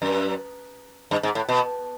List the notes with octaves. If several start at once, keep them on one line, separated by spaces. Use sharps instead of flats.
F#2
G2
G#2
A2
B2